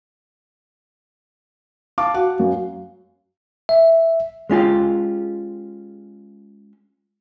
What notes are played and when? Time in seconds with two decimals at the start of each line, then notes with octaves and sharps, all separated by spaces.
1.98 F5 A5 D6
2.14 F#4 F5 F#5
2.39 F#2
3.69 E5
4.50 G#3 C#4 F4 G4